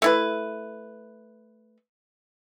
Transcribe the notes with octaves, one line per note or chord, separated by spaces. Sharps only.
A3 E4 B4